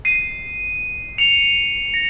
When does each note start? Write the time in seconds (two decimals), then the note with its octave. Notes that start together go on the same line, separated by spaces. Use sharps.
0.05 C7 D#7
1.18 C#7 F7
1.94 A#6 C#7